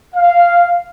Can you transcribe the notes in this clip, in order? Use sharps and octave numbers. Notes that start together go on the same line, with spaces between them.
F5